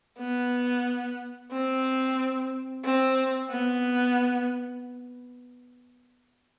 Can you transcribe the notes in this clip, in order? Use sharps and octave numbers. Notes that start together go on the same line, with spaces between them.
B3
C4
C4
B3